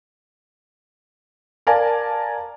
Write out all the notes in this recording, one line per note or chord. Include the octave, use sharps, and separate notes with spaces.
A#4 D5 F5 G#5 A5